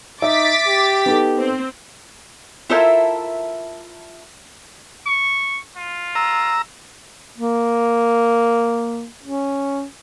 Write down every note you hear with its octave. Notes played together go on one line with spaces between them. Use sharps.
D#4 E5 D6 A6 B6
G4
B3 D#4 A4
C4
E4 F4 A4 A#4 C5 E5
C#6
F4
A#5 E6
A#3
C#4